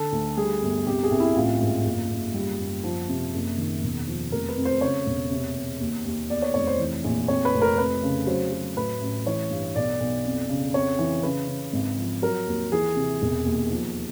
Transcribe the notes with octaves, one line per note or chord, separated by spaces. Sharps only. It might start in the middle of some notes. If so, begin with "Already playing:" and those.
Already playing: D3 A4
D2
G3 G#4
G1
C2 G4
G#4
C2
E4
A1 F4
G#2
F#1
F#1
G3
F#1
F3
C3
F#1
D#3
E1
F3
F1 A#4
B4
F2
C5
C#3 C#5
E1
C3
E2
D#2
D#2
E2 D5
C#5
F1 C#5
C5
E3
A#1
F2 C#5
B4
F1
A#4
F2 B4
C#3
F#3 C5
F#3
A2 B4
A1
E3 C#5
G2
B1 D5
B1
F2
C#3
F2 C#5
E3
C#3 B4
C#3
G#1
F3
F#3 A#4
D#2
E3 G#4
C3
E1
D#2
F3